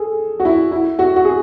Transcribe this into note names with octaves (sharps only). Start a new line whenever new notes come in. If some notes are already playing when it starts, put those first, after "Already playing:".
Already playing: G#4 A4
F#4
E4
E4
F#4
F#4
G#4